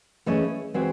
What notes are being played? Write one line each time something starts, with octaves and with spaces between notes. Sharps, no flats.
E3 A3 C#4 G#4 D#5
E3 G#3 C4 F#4 C5